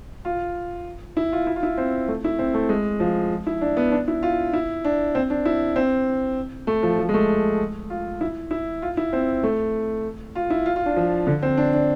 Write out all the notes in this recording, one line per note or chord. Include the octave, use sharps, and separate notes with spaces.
F4
E4
F4
E4
F4
E4
C4
A3
E4
C4
A3
G#3
F3
E4
D4
B3
D4
E4
F4
E4
D4
C4
D4
E4
C4
A3
F3
F3
G#3
A3
F4
E4
E4
F4
E4
C4
A3
F4
E4
F4
F4
D4
F3
D3
C4
D4
D4